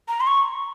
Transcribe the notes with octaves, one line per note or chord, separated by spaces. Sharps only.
A#5
C6
C#6